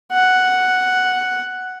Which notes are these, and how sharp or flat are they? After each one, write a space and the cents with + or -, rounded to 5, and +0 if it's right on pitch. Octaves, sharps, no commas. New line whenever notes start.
F#5 +0